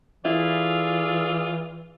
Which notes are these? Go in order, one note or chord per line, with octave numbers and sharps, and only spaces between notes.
E3 E4 F4 G#4 A4 D5